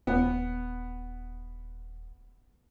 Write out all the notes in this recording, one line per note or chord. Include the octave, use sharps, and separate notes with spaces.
D#1 B3